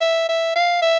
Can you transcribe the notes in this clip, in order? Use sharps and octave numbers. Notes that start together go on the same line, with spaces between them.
E5
E5
F5
E5